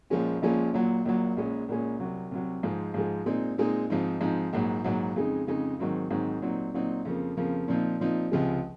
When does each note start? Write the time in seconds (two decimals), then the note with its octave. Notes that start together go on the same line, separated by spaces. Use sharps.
0.10 A#1 A#2 F3 G#3 C#4
0.42 A#1 A#2 F3 G#3 C#4
0.74 A#1 A#2 F#3
1.05 A#1 A#2 F#3
1.37 A#1 A#2 G#3 C#4
1.68 A#1 A#2 G#3 C#4
2.00 C2 C3 F#3
2.31 C2 C3 F#3
2.63 G#2 F3 G#3
2.94 G#2 F3 G#3
3.26 A#2 G#3 C4 D#4
3.58 A#2 G#3 C4 D#4
3.90 G#2 F3 C4 D#4
4.21 G#2 F3 C4 D#4
4.53 A#1 G#2 F#3
4.84 A#1 G#2 F#3
5.16 F2 C#3 G#3 D#4
5.47 F2 C#3 G#3 D#4
5.79 G#2 D#3 F#3 C4 D#4
6.11 G#2 D#3 F#3 C4 D#4
6.42 A#2 F#3 C4 D#4
6.74 A#2 F#3 C4 D#4
7.05 F2 C#3 F3 A#3
7.37 F2 C#3 F3 A#3
7.68 A#2 F3 C4 D#4
8.00 A#2 F3 C4 D#4
8.32 C#2 C3 F3 G#3